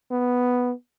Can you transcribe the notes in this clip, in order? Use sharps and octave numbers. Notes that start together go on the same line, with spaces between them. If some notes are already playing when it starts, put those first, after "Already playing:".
B3